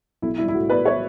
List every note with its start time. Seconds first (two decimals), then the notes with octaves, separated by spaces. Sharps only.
0.22 B1 E4
0.38 G3 E4
0.48 E4
0.54 A2 F#4
0.70 B3 B4 D5
0.85 C#5 E5